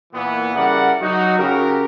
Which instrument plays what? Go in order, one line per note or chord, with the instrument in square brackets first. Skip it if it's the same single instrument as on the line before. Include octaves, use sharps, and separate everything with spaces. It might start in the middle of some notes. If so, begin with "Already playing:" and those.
[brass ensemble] A#2 E3 B3
C#3 G3 E4 A#4 D5 F#5
F#3 D#4 F#4
C#3 C#4 F#4 G4 A#4